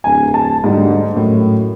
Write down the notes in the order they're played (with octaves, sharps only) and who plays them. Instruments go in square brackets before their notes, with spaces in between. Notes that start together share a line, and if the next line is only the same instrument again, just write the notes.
[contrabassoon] D1 [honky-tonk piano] G#5
[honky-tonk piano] A5
[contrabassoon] D2 [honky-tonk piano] G#2 G3
[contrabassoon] F#2 [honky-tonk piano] A2